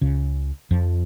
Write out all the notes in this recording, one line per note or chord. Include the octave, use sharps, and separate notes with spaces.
C#2 C#3
F2 F3